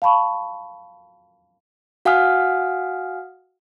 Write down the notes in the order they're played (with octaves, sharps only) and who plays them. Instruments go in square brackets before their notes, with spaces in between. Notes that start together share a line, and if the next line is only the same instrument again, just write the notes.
[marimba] F5 A5 B5 C#6
[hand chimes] F#4 F5 F#5 G#5 D#6 F6